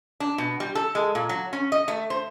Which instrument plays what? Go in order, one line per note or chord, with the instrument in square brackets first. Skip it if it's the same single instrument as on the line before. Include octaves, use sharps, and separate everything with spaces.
[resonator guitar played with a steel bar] D4
B2
G3
A4
G#3
A#2
F#3
C#4
D#5
A3
C5